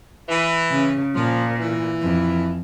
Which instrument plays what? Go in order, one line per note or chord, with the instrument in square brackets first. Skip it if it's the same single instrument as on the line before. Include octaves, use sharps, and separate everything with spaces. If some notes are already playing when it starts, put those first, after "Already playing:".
[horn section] E3
[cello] C#3
[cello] A#2 [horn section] F3
[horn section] E3
[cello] F2